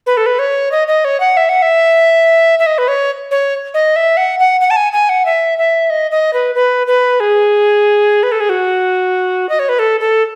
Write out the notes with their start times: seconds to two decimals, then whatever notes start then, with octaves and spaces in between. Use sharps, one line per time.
0.06 B4
0.17 A4
0.26 B4
0.39 C#5
0.72 D#5
0.88 D#5
1.05 C#5
1.20 F#5
1.37 E5
1.49 F#5
1.62 E5
2.59 E5
2.66 D#5
2.78 B4
2.88 C#5
3.31 C#5
3.74 D#5
3.96 E5
4.17 F#5
4.39 F#5
4.61 F#5
4.70 A5
4.76 G#5
4.93 G#5
5.09 F#5
5.25 E5
5.58 E5
5.90 D#5
6.11 D#5
6.33 B4
6.55 B4
6.87 B4
7.20 G#4
8.23 B4
8.32 A4
8.40 G#4
8.49 F#4
9.49 D#5
9.59 C#5
9.69 B4
9.79 A4
10.00 A4